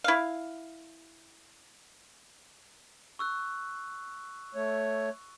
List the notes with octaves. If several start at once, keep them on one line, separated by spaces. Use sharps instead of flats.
E4 F5
C#6 E6 F#6
A3 C#5